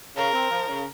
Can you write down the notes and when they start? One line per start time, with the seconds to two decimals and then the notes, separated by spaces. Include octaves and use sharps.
0.17 C#3 A#4
0.33 C4
0.51 F3
0.68 C#3